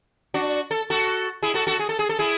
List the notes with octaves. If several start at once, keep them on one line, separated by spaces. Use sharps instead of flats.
D4 F#4
A4
F#4 A4
E4 G#4
F#4 A4
F#4 A4
G#4
A4
G#4
A4
E4 G#4